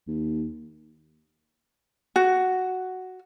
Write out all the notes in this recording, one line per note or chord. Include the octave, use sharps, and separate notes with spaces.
D#2
F#4